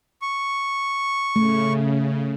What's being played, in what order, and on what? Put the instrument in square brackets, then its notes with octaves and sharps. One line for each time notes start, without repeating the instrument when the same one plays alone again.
[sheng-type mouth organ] C#6
[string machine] C#3 [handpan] A3